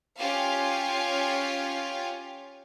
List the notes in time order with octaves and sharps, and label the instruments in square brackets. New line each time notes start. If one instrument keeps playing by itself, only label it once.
[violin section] C#4 F4 G4 F5